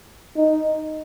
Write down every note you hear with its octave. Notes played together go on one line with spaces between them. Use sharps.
D#4